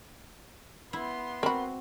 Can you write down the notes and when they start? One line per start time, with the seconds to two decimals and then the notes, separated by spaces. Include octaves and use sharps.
0.93 B3 E4 C6
1.43 C4 F#4 A#4 B5